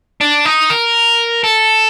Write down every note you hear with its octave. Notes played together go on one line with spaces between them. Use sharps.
D4
D#4
A#4
A4